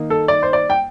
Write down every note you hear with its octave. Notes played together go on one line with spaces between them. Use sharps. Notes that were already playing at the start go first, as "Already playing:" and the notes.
Already playing: D#3 A#3 D#4
A4
D5
C5
D5
G5